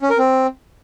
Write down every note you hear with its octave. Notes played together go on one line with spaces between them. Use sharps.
C#4
A#4
C4